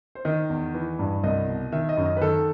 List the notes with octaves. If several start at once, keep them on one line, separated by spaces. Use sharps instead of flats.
C5
D#3 D#5
E2
E3
G2
C2 D#5
B2
D#3 E5
D#5
F#2
D#5
B4
D#3 A4